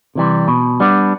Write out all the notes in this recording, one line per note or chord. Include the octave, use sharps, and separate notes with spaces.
C3 E3 G3
B2
G3 B3 D4